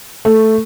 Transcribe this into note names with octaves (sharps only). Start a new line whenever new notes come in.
A3